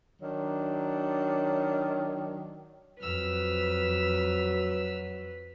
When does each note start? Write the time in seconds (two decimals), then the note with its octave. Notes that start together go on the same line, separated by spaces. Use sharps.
0.22 D#3 F#3 D4
3.01 F2 F#3 B4 E6 F6